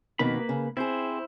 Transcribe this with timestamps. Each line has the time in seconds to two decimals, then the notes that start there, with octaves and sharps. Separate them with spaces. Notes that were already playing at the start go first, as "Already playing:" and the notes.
0.19 F2 B2 D#3 A#3 B4 B5
0.49 C#3
0.77 C4 E4 G#4 C5